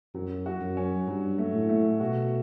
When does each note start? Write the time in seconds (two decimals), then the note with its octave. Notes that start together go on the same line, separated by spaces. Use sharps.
0.15 F#2 F#3
0.46 F#4
0.61 F#2
0.77 C#4
1.08 G2 F#3
1.38 A3
1.54 A2
1.69 A3
2.00 B2 F#4